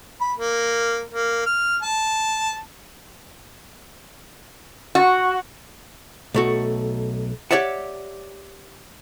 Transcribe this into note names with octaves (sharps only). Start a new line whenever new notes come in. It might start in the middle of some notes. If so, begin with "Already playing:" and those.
B5
A#3
A#3
F6
A5
F#4
B1 A3 F#4
G4 C#5 D5 E5 F#5